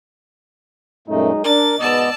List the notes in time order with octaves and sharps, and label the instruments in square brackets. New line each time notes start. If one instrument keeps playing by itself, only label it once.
[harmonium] F#2 A#2 A3 [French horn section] F#3 G#3 D#4
[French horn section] D4 [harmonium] A#4 [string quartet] A6
[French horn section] G#2 B2 [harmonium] B3 D#5 [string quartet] D5 A5 E6